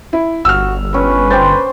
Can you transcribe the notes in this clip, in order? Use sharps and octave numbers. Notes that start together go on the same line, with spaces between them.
E4
G1 F#4 E6 F6
C#4 B4
C5 G5 D6 A6